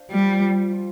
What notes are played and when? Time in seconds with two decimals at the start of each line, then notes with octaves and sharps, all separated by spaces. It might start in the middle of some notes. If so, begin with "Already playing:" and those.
Already playing: D4 C5 F5
0.11 F3 G3
0.41 F3
0.72 F4